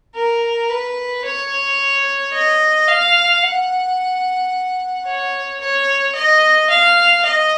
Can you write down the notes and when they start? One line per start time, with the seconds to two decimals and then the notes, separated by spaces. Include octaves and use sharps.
0.15 A#4
0.70 B4
1.25 C#5
2.33 D#5
2.88 F5
3.43 F#5
5.06 C#5
5.61 C#5
6.15 D#5
6.70 F5
7.25 D#5